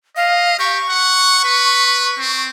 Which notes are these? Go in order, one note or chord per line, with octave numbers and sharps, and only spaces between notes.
D#5 F5
G4 C#6
F#5
B4
C4